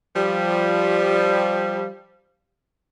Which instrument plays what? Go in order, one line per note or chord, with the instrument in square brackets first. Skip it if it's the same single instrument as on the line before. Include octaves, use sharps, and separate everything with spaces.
[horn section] F3 G3